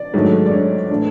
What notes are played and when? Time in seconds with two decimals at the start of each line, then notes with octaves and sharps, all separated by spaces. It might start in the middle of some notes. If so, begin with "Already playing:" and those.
Already playing: D5
0.14 G#2 D#3 F#3 A3
0.46 D5
0.51 C#5
0.90 A2 E3 A3 D4